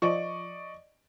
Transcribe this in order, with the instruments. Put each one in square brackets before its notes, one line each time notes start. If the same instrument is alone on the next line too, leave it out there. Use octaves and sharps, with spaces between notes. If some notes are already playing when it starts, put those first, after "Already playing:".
[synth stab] F3 [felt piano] D5 D#5 C#6